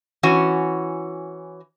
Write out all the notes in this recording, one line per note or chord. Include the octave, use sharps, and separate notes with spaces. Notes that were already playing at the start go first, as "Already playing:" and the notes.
E3 C#4 F#4